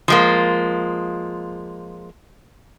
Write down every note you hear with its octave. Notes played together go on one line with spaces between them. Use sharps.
F3 G#3 A#3